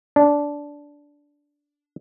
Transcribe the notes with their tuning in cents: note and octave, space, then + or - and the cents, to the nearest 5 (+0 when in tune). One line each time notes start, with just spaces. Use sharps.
D4 -10